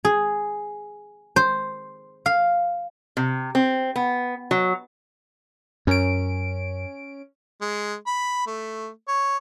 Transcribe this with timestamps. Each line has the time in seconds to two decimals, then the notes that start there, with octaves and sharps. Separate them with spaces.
0.05 G#4
1.36 C5
2.26 F5
3.17 C3
3.55 C4
3.96 B3
4.51 F#3
5.87 F#2 C#4 D7
7.61 G#3
8.07 B5
8.47 A3
9.08 C#5